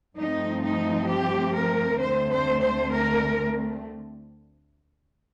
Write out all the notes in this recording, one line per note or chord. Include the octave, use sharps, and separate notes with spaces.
G2 F3 A3 C4 D#4
D#4
G4
A#4
D2 D3 A3 C4 C5
C5
C5
A#4